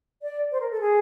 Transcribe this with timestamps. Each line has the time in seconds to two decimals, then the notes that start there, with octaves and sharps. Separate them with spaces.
0.22 D5
0.52 C5
0.60 A#4
0.71 A4
0.80 G#4